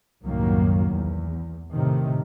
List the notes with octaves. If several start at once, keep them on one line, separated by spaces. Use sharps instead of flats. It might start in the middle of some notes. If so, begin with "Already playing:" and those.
C2 F#2 A2 D#3 F#3 A#3
E2
A2 C3 D#3